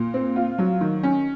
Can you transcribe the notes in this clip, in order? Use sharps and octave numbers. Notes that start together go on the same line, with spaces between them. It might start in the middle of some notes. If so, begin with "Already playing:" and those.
Already playing: A#2
C4
F4
F#3
D#3
C#4